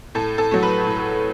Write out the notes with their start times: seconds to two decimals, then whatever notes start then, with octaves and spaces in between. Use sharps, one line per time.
0.15 A2 A4
0.38 A4
0.51 F#3 A3
0.63 B4
0.87 A2